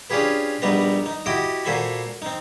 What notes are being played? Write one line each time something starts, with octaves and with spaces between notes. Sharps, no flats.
C#4 D4 F4 G4 G#4 B4
A#1 G3 B3 D#4 B4 A#5
D#4
E4 F#4 G4 D#5 G5
A#2 F#4 A4 C5 G#5 B5
C4 D#4